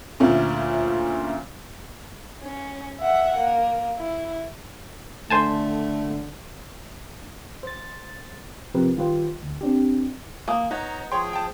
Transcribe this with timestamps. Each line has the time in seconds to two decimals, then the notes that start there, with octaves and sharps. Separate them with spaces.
0.20 D2 A#2 A3 C#4
2.43 C#4
3.00 E5 F#5
3.37 A#3
3.99 E4
5.30 F#1 D3 A3 C5 G#5 A5
7.63 C5 A6
8.74 C3 F3 C4 G4 A#4 B4
8.96 D#3 G3 F4 G4 B4 C5
9.43 D2
9.61 C4 D4 G4
10.48 A#3 G#5 D#6
10.71 B3 D#4 C#5 A#5
11.12 F3 G#4 C#5 G5 C6
11.33 G5 A5